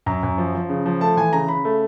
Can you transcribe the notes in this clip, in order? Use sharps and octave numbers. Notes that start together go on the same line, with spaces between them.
F#2 A#5
F#2
F3
F3
C#3
F3
A3 A5
E3 G#5
C#3 A#5
C#3 B5
A3